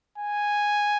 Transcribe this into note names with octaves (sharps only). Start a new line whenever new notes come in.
G#5